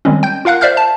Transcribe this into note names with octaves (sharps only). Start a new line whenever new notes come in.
D#3 G3 G#3 C4 C#4
G5 G6
F4 A#4 F5 F#5 F#6
C5 D5 E5 F5 F6 G6
A5